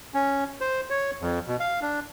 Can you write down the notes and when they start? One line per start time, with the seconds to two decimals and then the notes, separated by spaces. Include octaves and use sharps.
0.14 C#4
0.61 C5
0.90 C#5
1.21 F2
1.47 B2
1.60 F5
1.82 D4